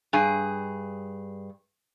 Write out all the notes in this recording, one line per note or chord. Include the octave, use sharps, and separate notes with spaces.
G2 G#4